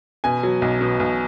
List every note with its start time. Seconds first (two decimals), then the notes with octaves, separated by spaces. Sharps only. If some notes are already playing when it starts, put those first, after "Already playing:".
0.24 B2 G#5
0.43 F#3
0.62 B1
0.81 B2
1.00 B1